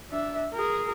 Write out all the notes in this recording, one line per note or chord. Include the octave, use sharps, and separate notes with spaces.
D4 E5
G#4 A#4